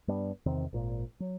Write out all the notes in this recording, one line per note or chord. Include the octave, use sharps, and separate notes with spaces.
G2 G3 B3 D4
E2 C3 D#3 C4
G#1 A#2
F#3